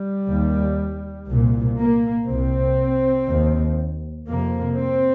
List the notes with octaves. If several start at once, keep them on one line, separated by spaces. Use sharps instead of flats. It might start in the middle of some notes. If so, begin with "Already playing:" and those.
Already playing: G3
D#2
C2 A#2
A#3
C2 C3 C4
D#2
F2 C3 A#3
C4